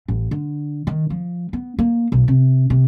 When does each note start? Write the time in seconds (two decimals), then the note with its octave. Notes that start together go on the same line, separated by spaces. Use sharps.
0.08 A1
0.31 D3
0.87 D#3
1.10 F3
1.53 B3
1.79 A#3
2.12 B1
2.28 C3
2.70 C3